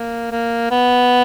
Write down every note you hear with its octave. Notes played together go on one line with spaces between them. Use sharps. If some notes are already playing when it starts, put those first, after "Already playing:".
Already playing: A#3
A#3
B3